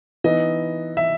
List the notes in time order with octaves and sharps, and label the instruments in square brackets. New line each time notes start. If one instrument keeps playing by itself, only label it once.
[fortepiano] E3 B3 D#4 [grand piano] D#5
[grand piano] E5